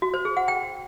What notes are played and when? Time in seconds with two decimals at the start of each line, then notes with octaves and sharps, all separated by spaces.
0.02 F#4
0.14 C5
0.25 G#4
0.37 F#5
0.48 G5